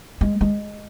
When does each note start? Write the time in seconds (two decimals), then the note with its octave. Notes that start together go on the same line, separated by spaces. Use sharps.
0.21 G#3
0.41 G#3